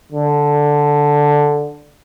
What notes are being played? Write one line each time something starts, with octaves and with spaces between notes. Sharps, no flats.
D3